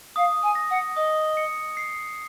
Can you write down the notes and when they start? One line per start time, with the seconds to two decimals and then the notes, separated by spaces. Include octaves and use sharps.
0.16 F5 D#6
0.42 G#5
0.55 A#6
0.70 F#5
0.96 D#5 D#6
1.37 C#7
1.77 C7